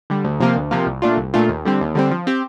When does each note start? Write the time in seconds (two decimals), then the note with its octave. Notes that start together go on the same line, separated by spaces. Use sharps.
0.10 D3 G3
0.24 D2
0.40 C3 F3 A#3 F4
0.56 D2
0.71 C3 F3 A#3 F4
0.86 C2
1.02 A#2 A3 D4 F4
1.17 C2
1.34 A#2 A3 D4 F4
1.49 D#2
1.65 D3 G3 C4
1.81 D#2
1.95 D3 G3 C4
2.11 F3
2.27 C4 G4